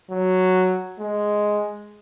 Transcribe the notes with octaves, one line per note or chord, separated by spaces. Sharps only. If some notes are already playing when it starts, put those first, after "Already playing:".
F#3
G#3